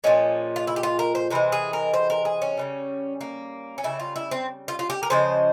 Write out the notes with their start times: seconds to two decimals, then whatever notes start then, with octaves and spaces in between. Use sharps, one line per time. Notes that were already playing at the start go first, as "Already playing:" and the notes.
0.04 A#2 F3 G#3 C#4
0.56 F4
0.67 E4
0.76 G4
0.83 F4
0.99 A#4
1.15 C5
1.30 C3 E3 G#3 C5
1.52 G#4
1.73 A#4
1.94 C5
2.10 A#4
2.25 G#4
2.42 C#4
2.57 C#3 E3 G3
3.21 A#3
3.78 C#4
3.83 C#3 G3 E4
4.00 F4
4.16 E4
4.31 C4
4.68 F4
4.79 F4
4.90 G4
5.03 A#4
5.10 C#3 F3 G#3 C5